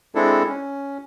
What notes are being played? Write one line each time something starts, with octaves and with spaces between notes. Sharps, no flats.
G#3 C4 D4 E4 A4
C#4